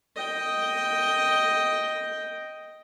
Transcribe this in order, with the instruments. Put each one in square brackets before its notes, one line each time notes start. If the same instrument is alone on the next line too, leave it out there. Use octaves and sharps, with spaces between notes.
[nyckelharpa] D#5 G5